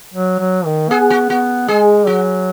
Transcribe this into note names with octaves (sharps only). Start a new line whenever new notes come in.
F#3
F#3
D#3
B3 G#4
F#4
B3 F#4
G#3 G#4
F#3 F#4